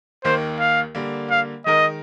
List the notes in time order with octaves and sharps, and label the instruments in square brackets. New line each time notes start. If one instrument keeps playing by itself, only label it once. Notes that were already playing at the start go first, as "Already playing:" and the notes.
[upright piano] D#2 D#3 A#3 [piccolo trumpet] C5
[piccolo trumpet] F5
[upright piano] D3 G3 A#3
[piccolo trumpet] F5
[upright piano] D#3 G#3 D#4 A#4 [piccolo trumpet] D#5